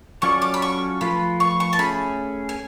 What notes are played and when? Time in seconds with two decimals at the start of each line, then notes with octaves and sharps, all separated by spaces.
0.22 F#3 C#4 F4 A4 D5 C#6
0.42 D6
0.54 B5
0.62 C#6
1.01 F3 A3 F4 B4 B5
1.40 C#6
1.60 C#6
1.73 A5
1.79 A3 C#4 G#4 B5
2.49 G#5